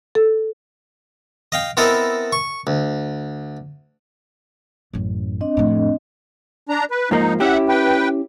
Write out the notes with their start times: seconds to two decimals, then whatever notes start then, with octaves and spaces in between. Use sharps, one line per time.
0.15 A4
1.52 D#5 F5 G5
1.77 B3 C4 E4 A4 A#4 D#5
2.33 C#6
2.67 D2
4.93 A1 F#2
5.41 C4 D4 D#5
5.57 F2 A2
6.69 D4 A#5
6.91 B4
7.11 G#2 F3 A#3 D#4
7.40 C#4 E4 G4 E5 F#5
7.69 B4 G5